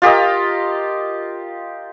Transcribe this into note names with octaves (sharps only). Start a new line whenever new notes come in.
F4 G4 A#4 D#5